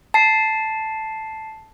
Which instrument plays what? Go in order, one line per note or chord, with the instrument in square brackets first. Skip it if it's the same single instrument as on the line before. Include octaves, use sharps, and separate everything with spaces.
[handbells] A5 C7